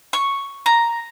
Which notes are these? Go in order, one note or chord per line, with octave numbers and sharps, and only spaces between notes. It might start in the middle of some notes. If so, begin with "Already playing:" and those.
C#6
A#5